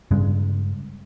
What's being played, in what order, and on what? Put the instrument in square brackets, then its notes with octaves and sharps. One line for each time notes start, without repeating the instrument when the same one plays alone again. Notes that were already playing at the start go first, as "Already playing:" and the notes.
[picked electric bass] G2 C#3 G#3